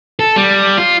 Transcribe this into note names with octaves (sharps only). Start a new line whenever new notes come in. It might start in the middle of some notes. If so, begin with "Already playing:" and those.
A4
G3
F4